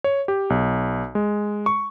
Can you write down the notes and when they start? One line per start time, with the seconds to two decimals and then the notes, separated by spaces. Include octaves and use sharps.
0.04 C#5
0.28 G4
0.50 B1
1.15 G#3
1.66 C#6